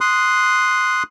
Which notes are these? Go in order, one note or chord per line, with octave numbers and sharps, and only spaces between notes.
C6 D#6 F#6